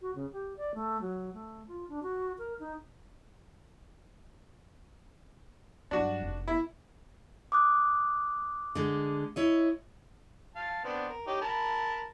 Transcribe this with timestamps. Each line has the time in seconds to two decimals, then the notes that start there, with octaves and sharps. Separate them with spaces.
0.01 F#4
0.15 C#3
0.32 G4
0.57 D5
0.74 A3
1.02 F#3
1.34 A3
1.68 F4
1.89 D4
2.03 F#4
2.39 A#4
2.59 D#4
5.91 G2 F#3 D4 F#4
6.21 F1
6.48 E4
7.52 D6 D#6 F#6
8.75 D3 G#3
9.36 E4 C#5 D#5
10.56 F5 A5
10.85 B3 C4 D4
11.09 A#4
11.27 D#4 G4 C#5
11.41 A#4 A5 B5